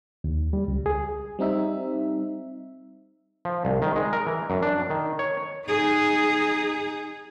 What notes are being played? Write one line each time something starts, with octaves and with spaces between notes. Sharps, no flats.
D#2
G3
C#2
G#4
G3 C4 D#4 E5
F3
C2
D#3
G#3
A#4
E3
F#2
D4
D#3
C#5
D#4 G#4